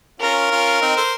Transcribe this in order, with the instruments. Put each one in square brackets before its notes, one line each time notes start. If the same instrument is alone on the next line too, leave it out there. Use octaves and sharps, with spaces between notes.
[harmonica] C#4 F4 [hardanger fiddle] A#4
[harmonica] C#4 F4
C4 D#4
A4 C5